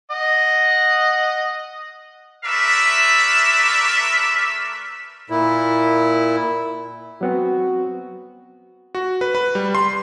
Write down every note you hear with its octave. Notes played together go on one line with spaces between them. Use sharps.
D#5 F#5
A3 A#4 B4 D5 E5
A#2 E4
F#3 B3 C4 F#4
F#4
B4
B4
G3
C6